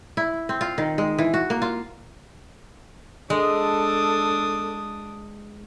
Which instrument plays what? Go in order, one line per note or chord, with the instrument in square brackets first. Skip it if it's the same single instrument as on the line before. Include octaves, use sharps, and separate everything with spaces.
[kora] E4
C4
F4
D#3
G#3
E3
F#4
A#3
F4
[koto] G#3 [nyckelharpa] D4 D#6 [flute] A4